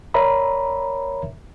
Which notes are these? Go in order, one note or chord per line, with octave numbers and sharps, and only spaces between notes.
A#4 C#5 D5 E5 A#5 B5